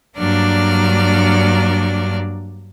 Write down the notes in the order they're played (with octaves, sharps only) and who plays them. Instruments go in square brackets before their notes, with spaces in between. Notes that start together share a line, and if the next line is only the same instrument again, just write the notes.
[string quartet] G2 F#3 A#3 D4 D5 F6